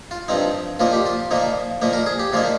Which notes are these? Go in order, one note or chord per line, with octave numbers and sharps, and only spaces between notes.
F4
G2 F3 C4 D#4
A#2 F3 A#3 D#4 F4
G4
F4
A#2 F3 A#3 D#4
A#2 F3 A#3 D#4
A#4
G#4
G4
A#2 F3 A#3 D#4 F4